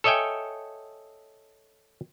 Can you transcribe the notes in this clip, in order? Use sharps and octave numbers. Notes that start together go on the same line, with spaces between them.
A4 C#5 D#5 E5 G5 G#5